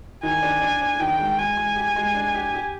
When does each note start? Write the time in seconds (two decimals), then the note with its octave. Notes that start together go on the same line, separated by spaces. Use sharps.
0.23 D#3 G#5
0.43 D4
0.62 D4
0.81 D4
1.00 D#3 G5
1.19 G#3
1.38 G#3 G#5
1.57 G#3
1.76 G4
1.96 G#3
2.15 D4
2.34 G4
2.54 G4